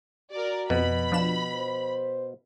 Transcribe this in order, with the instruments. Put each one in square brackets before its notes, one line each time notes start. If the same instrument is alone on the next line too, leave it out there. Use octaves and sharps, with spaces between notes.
[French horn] F#4 [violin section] A#4 D5
[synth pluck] F2 [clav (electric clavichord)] B2 [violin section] B5
[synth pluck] F3 D4 E7
[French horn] C5